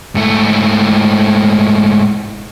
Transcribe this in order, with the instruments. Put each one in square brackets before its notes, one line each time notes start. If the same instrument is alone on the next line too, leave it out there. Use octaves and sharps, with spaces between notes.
[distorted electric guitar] G#2 A3